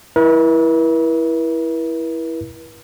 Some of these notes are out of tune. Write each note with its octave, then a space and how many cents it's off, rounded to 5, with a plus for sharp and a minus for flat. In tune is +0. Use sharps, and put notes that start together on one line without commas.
E4 +0 B4 -45